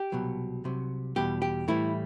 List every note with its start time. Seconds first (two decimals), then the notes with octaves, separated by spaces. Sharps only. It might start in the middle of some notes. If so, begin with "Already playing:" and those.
Already playing: G4
0.12 C2 B2 F#3
0.64 C2 C3 F#3
1.16 E2 B2 G3 G4
1.42 G4
1.68 A2 E3 G3 E4